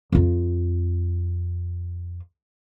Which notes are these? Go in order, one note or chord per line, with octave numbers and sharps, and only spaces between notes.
F2 F4